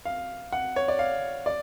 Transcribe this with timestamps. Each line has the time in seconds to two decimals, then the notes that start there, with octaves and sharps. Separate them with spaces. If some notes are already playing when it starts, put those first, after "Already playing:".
0.05 F5
0.52 F#5
0.76 C#5
0.88 D5
0.99 F5
1.46 D5